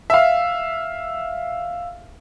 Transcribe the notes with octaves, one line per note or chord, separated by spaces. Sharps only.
E5 F5